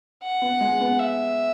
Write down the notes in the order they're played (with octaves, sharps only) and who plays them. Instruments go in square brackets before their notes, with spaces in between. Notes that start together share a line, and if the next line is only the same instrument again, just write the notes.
[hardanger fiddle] F#5
[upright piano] B3
G#3
B3
[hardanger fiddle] E5